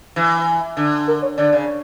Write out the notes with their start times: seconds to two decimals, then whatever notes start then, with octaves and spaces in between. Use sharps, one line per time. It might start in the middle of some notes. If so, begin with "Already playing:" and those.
0.16 E3
0.77 D3
1.07 A#4
1.22 C#5
1.38 D3 D5
1.52 C#3